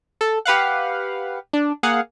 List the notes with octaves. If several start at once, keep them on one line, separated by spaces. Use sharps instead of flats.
A4
G4 B4 F5 F#5
D4
A#3 G#4 F5 F#5